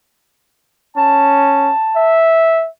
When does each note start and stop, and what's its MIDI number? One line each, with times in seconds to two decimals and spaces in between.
0.97 1.72 61
0.97 2.18 81
1.97 2.69 76